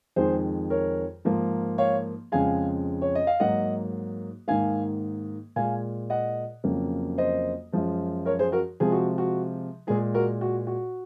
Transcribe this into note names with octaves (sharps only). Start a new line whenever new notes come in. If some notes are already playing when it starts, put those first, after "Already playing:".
F2 D#3 G#3 G#4 C5
A#4 C#5
G#2 F3 A#3
C#5 F5
F2 C#3 G#3 F5 G#5
C#5
D#5
F5
G#2 F#3 A#3 D#5 F#5
G#2 D#3 A#3 F5 G#5
A#2 G#3 F5 G#5
D#5 F#5
F2 C#3 F#3 A#3
C5 D#5
F#2 F3 G#3
A#4 C#5
G#4 C5
F#4 A#4
C3 F3 G#3 G#4
F#4
F#4
A#2 G#3 G#4
F#4 A#4
F#4
F#4